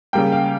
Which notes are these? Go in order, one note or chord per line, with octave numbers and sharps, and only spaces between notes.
C#3 G3 A#3 G5
F5